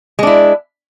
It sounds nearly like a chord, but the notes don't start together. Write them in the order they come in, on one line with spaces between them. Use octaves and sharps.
G#3 D4 E4